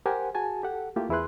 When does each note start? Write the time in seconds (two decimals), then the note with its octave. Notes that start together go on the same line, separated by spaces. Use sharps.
0.06 G4 A#4 C5 F#5 G#5
0.35 F#4 G#4 G#5 A5
0.63 G4 A4 F#5
0.96 A3 A#3 E4 F4 G4
1.09 E2 E4 G#4 B4 C6 F#6